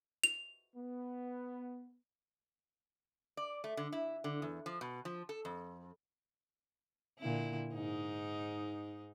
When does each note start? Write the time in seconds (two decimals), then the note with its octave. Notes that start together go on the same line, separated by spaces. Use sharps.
0.24 F7
0.75 B3
3.37 D5
3.64 A3
3.77 D3
3.92 E4
4.24 D3
4.42 E2
4.66 F3
4.81 B2
5.05 F3
5.29 A4
5.45 F2
7.19 A#2 D3 E4
7.73 G#2 D#4